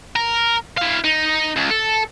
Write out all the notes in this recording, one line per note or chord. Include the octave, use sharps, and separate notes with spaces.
A#4
E4 F5
D#4
C#2
A4